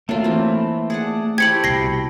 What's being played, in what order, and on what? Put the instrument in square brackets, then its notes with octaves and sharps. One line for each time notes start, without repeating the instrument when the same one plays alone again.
[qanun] F#3 F4 [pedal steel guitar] A3 [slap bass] A#3
[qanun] E3 C4
G#4 D5 F#5
[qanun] A3 E4 C5 [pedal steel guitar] G4 [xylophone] G#6 C#7 F#7
[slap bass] C2 B2 [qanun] C6 [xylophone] A#6 C7